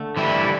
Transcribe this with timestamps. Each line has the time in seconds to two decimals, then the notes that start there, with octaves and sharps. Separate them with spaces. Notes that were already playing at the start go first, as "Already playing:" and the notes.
Already playing: D3 A3
0.17 E3 G3 E4